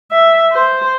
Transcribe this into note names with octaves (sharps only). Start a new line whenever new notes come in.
E5
C5